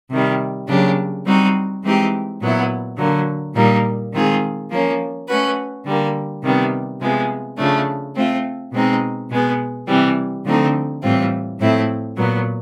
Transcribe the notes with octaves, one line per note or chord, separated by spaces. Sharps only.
C3 D#3 G3
C#3 F#3 A#3 D4 G4
G3 C4 D#4 F#4
E3 G#3 C4 D#4 G4
A#2 F#3 B3 E4
D3 F#3 A#3
A#2 G3 A#3 D#4
D#3 G#3 C4 F4 G#4
F3 A#3 C#4
A3 C#4 F#4 B4
D3 G3 A#3
C3 D#3 G3 B3
C3 F3 G#3 B3
C#3 F3 A3 D4
A3 C4 F4
B2 G#3 C4 D#4
B2 G#3 B3
C3 E3 G3 C4
D3 F3 A3 C4 D#4
A2 E3 G3 C4 F4
A2 F3 A3 C4 E4
A#2 F#3 B3